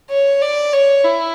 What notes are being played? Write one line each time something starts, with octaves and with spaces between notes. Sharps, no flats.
C#5
D5
C#5
E4